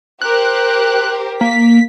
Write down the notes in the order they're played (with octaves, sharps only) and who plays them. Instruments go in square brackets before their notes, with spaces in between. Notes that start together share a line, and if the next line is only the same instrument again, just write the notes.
[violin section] G4 A#4 C5 [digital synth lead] F#6
[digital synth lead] A#3 [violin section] B6